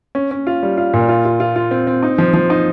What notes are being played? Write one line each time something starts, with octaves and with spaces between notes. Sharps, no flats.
C#4
C#4
F4
G3
F4
A#2
F4
F4
F4
F4
C4
C4
D#4
F3
F3
D#4